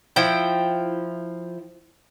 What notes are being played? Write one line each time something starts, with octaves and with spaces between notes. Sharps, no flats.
F3 E4 G5